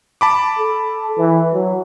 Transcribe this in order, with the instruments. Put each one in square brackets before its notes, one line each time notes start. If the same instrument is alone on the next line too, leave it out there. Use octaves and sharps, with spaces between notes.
[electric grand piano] A5 B5 D6
[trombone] A4
E3
F#3